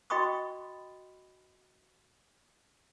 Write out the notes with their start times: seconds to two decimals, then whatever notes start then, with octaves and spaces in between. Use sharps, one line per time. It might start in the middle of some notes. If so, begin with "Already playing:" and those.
0.10 F#4 D#5 G5 B5 C#6 D#6